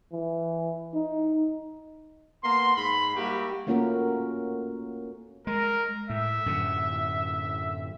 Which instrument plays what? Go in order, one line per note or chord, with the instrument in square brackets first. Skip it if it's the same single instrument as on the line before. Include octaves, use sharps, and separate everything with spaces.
[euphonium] E3
D#4
[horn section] A#3 B3 C6
G#2 B5
G3 A#3 E4 F#4 G4
[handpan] A3 A#3 C#4 F4 F#4 A#4
[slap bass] G#3 [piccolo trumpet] A#4
[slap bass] A2 [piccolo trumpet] E5
[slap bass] F#2 A2 D3